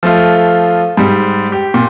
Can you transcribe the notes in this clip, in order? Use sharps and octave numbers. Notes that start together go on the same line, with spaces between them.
F3 A3 F4
G#2 G3
G4
A#2